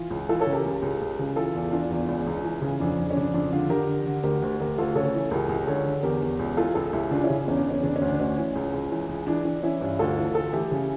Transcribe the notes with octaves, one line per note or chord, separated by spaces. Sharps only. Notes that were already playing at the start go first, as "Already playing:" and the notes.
Already playing: E3 F4
C#2
E3 F4 A4
A4 C#5
C#3
G4 A#4
C#2
C#2
C#2
C#3
E3 F4 A4
E2
E3 D4 F4
E2
C#2
C#2
E3
C#3
F2 D4
F2
C#4
C#3 D4
F2 D4
D3 D4 F4
D3 G4 A#4
D3
D3
D2 G4 A#4
D2
D2 G4 A#4
D2 F4 A4
C#3 A4 C#5
E3
C#2 G4 A#4
C#2
D3 A4 C#5
D3
E2 G4 A#4
E2
C#2
E3 F4 A4
C#2 F4 A4
C#2 E4 G4
C#3 D4 F4
C#4 E4
C#3
E2 C#4
D4
E2
C#4
C#3 D4
C#4
D2
D4
D2 C#4
E3
C#2
C#2
E3
C#2
E3 D4
E3 D4
E3 C#4 E4
G2
D2 F4 A4
E3
D2 F4 A4
E3 E4 G4
C#3